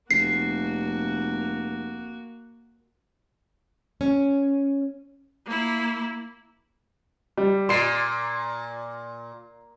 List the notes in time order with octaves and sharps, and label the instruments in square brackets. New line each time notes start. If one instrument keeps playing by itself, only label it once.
[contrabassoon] F1 [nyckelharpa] A#3 F#4 [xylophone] C7
[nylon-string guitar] C#4
[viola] A#3 E4
[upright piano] G3
[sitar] A#2 [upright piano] C6 C7